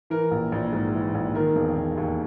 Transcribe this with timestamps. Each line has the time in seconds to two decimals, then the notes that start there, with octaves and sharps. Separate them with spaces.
0.10 E3 A#4
0.31 A#1
0.52 A#1
0.73 G#2
0.95 E3
1.15 A#1
1.35 D#3 A#4
1.56 E1
1.78 E1
1.97 D#2